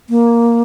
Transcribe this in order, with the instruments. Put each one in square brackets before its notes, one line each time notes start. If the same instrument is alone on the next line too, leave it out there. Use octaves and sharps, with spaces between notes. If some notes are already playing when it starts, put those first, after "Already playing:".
[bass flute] A#3